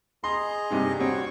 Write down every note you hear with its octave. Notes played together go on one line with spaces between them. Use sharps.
G#4 D#5 A#5 C6
G2 C3 D#4
G3 C4 F#4 C#5 C#6